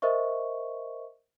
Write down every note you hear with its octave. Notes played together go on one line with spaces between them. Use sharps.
A#4 C5 D#5 E5 C#6